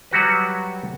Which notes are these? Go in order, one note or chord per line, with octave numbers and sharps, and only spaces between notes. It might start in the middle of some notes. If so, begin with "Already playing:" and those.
F#3 G3 F#4 B4